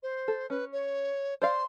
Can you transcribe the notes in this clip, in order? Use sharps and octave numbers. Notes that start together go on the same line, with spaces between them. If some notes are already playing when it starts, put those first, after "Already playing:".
C5
A4
C#4 B4
C#5
C5 D5 F5 C6